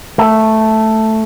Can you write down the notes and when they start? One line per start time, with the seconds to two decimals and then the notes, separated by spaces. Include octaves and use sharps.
0.18 A3